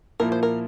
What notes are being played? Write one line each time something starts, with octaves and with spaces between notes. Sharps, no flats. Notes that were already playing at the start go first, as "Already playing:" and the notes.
A#2 F3 A#3 E4 A#4
C5
A#4